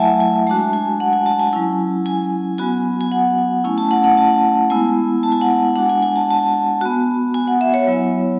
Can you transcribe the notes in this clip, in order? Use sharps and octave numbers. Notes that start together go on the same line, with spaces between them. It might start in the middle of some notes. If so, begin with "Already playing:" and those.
Already playing: F#3 A3 E4 E5 F#5 G#5 A5
G#5
G#3 D4 F#4 A5
G#5
F#5
G#5
A5
G#5
F#3 C#4 E4 G#5
G#5
F#3 B3 F#4 G#5
G#5
F#5
A3 C#4 E4 G#5
A5
F#5
F#5
A5
G#3 B3 E4 G#5
A5
G#5
F#5
G#5
G#3 D4 F#4 F#5
G#5
G#5
A5
A5
B3 F#4
G#5
F#5
E5
C#5
F#3 B3 E4